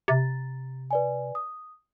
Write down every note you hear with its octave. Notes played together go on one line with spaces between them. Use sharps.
C3 A#5 A6
B4 D5 G#5
D#6